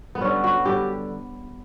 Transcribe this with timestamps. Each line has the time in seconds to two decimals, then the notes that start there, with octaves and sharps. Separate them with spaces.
0.15 B3
0.21 D3 G3 C#4
0.44 F#4
0.65 D3 G3 G4